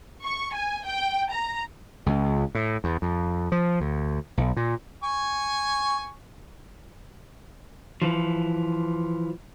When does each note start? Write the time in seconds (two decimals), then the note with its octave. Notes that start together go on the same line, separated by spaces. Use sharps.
0.24 C#6
0.54 G#5
0.84 G5
1.32 A#5
2.06 C#2
2.55 A2
2.84 E2
3.02 F2
3.52 F3
3.80 D2
4.37 B1
4.57 A#2
5.03 G#5 C#6
8.02 E3 F3